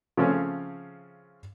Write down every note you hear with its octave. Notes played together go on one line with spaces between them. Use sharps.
C#3 F3 A3 C4 C#4